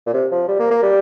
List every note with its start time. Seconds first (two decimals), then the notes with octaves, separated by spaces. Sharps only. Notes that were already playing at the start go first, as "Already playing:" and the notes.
0.07 A#2
0.13 C3
0.32 F3
0.48 G3
0.59 A#3
0.71 A#3
0.83 G3